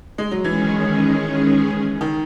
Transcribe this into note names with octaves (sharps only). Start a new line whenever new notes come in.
G#3
F#3
D#3 E3 G#3 C#4 G#4
D#3